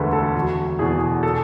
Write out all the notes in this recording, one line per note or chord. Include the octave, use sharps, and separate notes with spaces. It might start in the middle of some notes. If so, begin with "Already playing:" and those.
Already playing: E1 D2 D3 G#4 A4 B4
A4
E1 F#4
E2 B2 G#4
A4